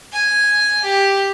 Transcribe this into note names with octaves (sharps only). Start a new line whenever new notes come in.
G#5
G4